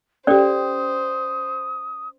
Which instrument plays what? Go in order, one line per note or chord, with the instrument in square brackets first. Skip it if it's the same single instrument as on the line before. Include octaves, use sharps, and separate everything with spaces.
[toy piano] C#4 D5 G5 [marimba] G4 A4 [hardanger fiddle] C5 [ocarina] D#6